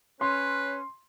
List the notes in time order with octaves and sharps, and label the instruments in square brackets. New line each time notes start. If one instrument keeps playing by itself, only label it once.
[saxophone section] C#4 [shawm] B4 [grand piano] C6